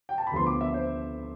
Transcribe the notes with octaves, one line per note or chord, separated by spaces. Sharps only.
G5
A5
B5
D2 D3 F3 B3 C6
D6
E5
C5